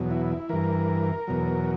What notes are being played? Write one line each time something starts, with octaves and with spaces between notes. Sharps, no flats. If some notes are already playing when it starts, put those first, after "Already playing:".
Already playing: E2 B2 F#3
E4
G2 E3 A#4
E2 B2 F#3